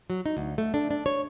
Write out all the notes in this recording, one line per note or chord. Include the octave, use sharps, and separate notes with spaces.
F#3
D#4
D2
A3
D4
D4
C#5